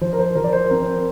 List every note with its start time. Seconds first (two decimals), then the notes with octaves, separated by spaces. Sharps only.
0.01 F3 C5
0.13 A#4
0.19 C5
0.35 F3 A#4
0.44 D5
0.53 C5
0.70 C4 A#4